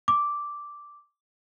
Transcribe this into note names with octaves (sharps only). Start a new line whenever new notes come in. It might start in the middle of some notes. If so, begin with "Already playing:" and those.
D6